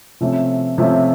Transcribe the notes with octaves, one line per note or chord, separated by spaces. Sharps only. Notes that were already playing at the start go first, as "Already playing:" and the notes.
C3 F3 A3 C#4
C3 F3 A3 C#4